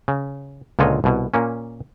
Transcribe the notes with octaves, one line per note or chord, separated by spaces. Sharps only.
C#3
C#2 A#2 D3 F4 C#5 D#5
C2 B2
A#2 A#3 C#4